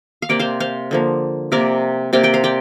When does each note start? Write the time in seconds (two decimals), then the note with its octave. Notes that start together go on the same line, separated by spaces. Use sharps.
0.22 F5
0.29 C3 A#3 D5 G5
0.39 C5 F5
0.60 C5 F5
0.91 D3 F3 A#3
1.52 C3 A#3 A#4 D5
2.13 C3 A#3 D5 G5
2.23 D5 G5
2.34 C5 F5
2.44 D5 G5